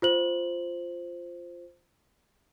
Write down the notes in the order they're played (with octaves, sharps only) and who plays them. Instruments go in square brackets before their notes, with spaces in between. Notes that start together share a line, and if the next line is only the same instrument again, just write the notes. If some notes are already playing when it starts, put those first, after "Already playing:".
[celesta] F4 C5 F#7